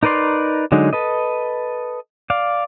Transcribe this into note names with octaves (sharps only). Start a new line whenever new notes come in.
D#4 A#4 B4 D5 C6
D3 F#3 G#3 D#4
A4 B4 D#5
D5 F5